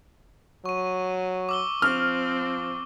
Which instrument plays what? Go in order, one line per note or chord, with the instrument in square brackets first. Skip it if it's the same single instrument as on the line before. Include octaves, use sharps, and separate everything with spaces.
[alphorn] F#3 [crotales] C#6 D#7
[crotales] D6 E6 G7
[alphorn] F3 [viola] C4 [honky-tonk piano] F6